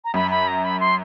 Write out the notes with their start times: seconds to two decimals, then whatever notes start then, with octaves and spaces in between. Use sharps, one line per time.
0.05 A#5
0.14 F#2 B5
0.31 B5
0.48 A#5
0.64 B5
0.80 C6